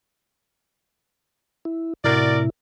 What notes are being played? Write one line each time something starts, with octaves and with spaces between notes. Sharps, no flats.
E4
A2 C3 E4 F#4 A#4 D5